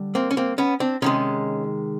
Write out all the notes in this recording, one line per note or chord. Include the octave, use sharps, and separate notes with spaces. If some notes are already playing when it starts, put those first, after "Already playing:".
Already playing: D3 G3
A#3 C4
C#4
A#3 C4
B3 C#4
C4 D4
C3 D#3 G#3 C#4 D#4